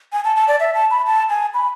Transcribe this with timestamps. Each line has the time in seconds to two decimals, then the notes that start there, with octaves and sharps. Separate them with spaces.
0.13 G#5
0.24 A5
0.36 A5
0.48 D5
0.60 E5
0.74 A5
0.91 B5
1.06 A5
1.30 G#5
1.54 B5